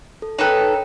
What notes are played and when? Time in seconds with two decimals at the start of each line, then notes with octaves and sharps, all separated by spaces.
0.22 A4
0.39 D#4 A4 B4 C#5 G5